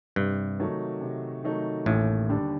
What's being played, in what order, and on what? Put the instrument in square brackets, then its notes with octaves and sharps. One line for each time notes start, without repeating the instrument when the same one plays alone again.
[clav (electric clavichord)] G2 [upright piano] C3
[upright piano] D#3 F#3 A3 D#4
C3
D#3 F#3 A3 D#4
[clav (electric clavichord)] A1 A2 [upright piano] D#2
[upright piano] D3 G3 D4